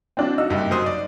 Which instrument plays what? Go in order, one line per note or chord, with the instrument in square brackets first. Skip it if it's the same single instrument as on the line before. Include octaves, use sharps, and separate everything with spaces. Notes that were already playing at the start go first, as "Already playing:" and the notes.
[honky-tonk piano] C4 D4 F#4
[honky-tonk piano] D#4 F#4 [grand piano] E6
[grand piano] F#1 G2 C3
F#2 C5 D#6
D5